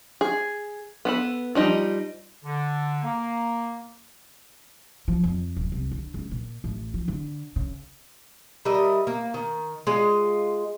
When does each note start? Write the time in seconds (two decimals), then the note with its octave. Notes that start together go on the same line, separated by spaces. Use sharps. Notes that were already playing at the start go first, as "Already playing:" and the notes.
0.21 G#4
1.05 B3 A4 B5
1.55 F3 G3 D#4
2.44 D3
3.03 A#3
5.08 F3
5.24 F2
5.56 D#1
5.72 C2
5.91 D3
6.14 C#2
6.31 A#2
6.64 A1
6.94 F3
7.08 D3
7.56 C#3
8.65 G3 A#4 D#5 E5
9.07 A#3
9.34 D#3
9.87 G#3 F4 D#5